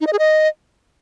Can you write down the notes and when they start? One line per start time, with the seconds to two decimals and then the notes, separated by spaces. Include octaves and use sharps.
0.01 D#4
0.07 D#5
0.13 G#4
0.19 D#5